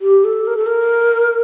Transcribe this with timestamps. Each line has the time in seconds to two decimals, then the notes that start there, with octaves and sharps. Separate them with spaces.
0.01 G4
0.24 A4
0.47 A#4
0.57 A4
0.67 A#4